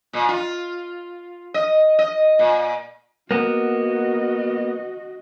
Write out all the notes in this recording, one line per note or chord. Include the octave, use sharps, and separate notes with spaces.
A#2
F4
D#5
D#5
A#2
A#3 B3 F#4 D#5